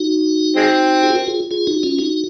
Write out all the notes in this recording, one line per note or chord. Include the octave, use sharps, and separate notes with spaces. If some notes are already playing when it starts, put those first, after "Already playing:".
Already playing: D#4 F#4
G#3 C4
F4 G#4
F#4 A#4
F4 G#4
F4 G#4
D#4 F#4
C#4 F4
D#4 F#4